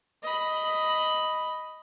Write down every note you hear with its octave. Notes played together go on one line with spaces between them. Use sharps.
D#5 B5